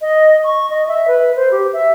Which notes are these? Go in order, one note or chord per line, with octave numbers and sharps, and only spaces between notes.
D#5
C#6
D#5
E5
B4
C5
G4
E5